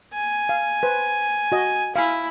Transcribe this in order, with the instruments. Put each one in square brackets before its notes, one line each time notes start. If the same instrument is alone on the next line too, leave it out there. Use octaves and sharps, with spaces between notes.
[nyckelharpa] G#5
[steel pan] F5
B4 C5
F#4 D#5
[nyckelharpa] E4 [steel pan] F5 G#5